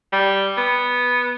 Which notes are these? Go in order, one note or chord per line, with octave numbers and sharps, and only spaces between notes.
G3
B3